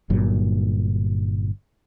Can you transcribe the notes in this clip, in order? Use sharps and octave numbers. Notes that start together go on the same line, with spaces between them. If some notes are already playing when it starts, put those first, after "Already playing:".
G1 G2 A#2 F#3